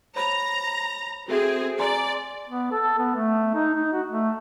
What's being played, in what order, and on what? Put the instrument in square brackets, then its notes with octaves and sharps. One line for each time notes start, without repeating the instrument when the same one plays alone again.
[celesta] C5 C#5 B5 [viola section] A#5
[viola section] C4 G#4 [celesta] F#4 A4 E5
[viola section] D5 [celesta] G#5 A#5 C6
[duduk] B3
A4
B3
A3
D#4
D#4
F#4
A3